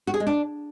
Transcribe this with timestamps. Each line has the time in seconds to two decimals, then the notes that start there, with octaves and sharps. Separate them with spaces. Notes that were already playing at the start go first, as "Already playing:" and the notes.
0.07 F#4
0.14 G#4
0.20 G#3
0.27 D4